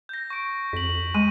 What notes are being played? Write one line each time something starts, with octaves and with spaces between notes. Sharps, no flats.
G6 A#6
C#6 D7
F2 B6 F#7
G#3 D#7